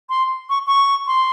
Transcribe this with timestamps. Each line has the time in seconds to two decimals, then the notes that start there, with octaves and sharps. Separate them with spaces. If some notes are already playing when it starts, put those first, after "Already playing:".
0.10 C6
0.49 C#6
0.67 C#6
1.07 C6